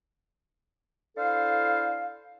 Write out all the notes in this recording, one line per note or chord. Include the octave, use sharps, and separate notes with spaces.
D4 E4 A4 C5 F5